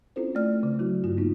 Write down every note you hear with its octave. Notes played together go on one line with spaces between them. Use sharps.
C4 C#4 E4 F4 A4 C5
A3 D5 F6
C#3
F#3 E4 F#4
G2 F4
A#3 B3 D#4